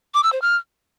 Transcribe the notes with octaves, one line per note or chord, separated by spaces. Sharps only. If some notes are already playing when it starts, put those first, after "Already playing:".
D6
E6
C5
F6